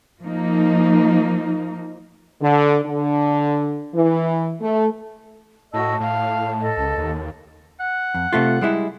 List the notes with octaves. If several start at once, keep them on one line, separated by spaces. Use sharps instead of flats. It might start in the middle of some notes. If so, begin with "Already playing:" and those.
F3 A#3 D#4
D3
D3
E3
A3
A2 F#4 D#5 A5 E6
A2 F5
A4 D#5
C#2
D#2
F#5
F2
C3 A3 F4
G3 G#3 E4